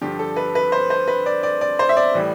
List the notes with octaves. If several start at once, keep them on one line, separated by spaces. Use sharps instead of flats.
G2 D3 F3 G4
A4
B4
B4
C5
C5
B4
D5
D5
D5
C5
E5
D5
A2 E3 G3